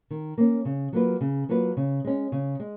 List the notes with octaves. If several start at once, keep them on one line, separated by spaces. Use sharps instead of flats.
D#3
A#3 C#4
C#3
F#3 A#3 F4 B4
C#3
F#3 A#3 F4 B4
C#3
G#3 C#4
C#3
G#3